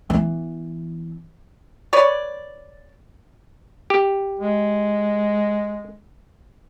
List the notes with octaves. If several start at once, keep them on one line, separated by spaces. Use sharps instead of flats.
E3 B3
B4 C#5 D5
G4
G#3